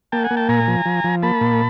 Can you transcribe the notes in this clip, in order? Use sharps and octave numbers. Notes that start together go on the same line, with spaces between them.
A#3 G5 A5
F#5 G#5
A#3
G5 A5
A#2 G#5 A#5
F3
F3
F3
A#3 A5 B5
A#2